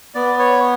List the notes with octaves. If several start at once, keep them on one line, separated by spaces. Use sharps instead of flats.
B3 D5
C#5